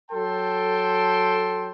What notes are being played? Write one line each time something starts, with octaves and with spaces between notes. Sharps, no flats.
F#3 A4 G5 A5 C6